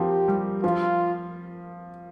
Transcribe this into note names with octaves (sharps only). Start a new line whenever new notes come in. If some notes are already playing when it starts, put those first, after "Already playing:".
Already playing: F3 A#3 C4 G4
G3
F3 F4